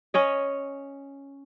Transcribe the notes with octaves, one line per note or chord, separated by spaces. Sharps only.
C#4 C#5 D#5